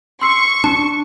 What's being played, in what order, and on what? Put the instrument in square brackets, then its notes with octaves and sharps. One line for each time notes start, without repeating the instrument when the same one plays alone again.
[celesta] C6 E6 C7 [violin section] C#6
[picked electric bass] D4 [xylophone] A5